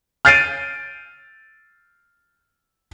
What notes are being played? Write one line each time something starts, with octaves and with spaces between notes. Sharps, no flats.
F6 G6 A6 C7 D7 D#7